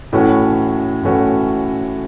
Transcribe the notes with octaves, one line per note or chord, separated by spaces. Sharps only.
A2 E3 A3 C#4 F#4
A2 E3 A3 C#4 F#4